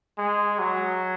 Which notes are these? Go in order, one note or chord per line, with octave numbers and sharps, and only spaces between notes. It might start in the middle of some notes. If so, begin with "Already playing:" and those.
G#3
F#3